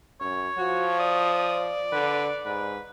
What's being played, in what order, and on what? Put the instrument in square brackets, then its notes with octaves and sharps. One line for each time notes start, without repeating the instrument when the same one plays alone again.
[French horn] F#2 [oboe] C#5
[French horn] F3 [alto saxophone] F#4
[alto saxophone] D5 [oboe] D#6
[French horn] D3 [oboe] B4
[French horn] G#2 [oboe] B4